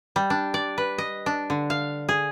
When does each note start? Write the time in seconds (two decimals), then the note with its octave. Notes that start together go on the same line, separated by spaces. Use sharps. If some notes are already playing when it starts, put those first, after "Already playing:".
0.16 G3
0.30 D4
0.54 D5
0.78 B4
0.98 D#5
1.26 D4
1.50 D3
1.70 F5
2.09 G#4